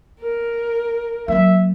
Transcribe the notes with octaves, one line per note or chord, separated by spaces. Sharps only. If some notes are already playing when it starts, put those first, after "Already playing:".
A#4
F#3 A#3 E5